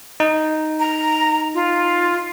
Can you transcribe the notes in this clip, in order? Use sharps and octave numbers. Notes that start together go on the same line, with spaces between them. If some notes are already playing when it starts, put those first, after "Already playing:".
D#4
A#5
F4